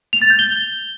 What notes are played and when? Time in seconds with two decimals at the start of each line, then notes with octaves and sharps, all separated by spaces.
0.13 F7
0.22 A6
0.30 G6
0.39 G7